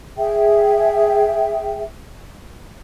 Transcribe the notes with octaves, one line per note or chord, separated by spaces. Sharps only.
G#4 E5 G5